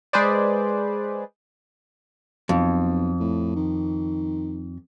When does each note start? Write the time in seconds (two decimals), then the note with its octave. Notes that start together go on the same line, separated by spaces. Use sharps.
0.13 G#3 G#4 B4 C5 D5
2.49 B1 F2
3.20 A2
3.56 D#3